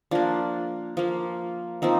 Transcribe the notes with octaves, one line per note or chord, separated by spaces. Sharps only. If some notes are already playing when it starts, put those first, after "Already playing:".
F3 A#3 D4
F3 A#3
F3 A#3 C4 D#4